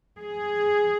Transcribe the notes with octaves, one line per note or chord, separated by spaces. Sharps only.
G#4